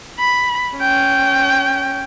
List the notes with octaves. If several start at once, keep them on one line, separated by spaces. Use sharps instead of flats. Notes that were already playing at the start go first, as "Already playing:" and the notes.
B5
C#4 G5